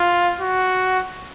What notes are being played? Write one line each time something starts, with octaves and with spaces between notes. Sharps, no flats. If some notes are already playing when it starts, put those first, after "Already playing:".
Already playing: F4
F#4